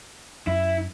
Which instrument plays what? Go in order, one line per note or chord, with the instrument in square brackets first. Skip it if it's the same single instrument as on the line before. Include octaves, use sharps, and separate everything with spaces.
[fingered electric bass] F#2 [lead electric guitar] E4